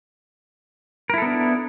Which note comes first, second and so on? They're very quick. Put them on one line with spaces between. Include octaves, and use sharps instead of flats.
A#4 E4 A4 B3 D4